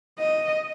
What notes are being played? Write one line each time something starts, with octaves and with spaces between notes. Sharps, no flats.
D#5